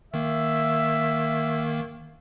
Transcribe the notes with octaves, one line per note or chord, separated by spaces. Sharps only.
D#3 A#3 E5